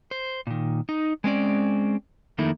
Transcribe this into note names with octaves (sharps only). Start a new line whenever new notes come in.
C5
A#2 D#3
D#4
G#3 C4 C#4 D5
F2 D#3 A3 A#3 D#4 E4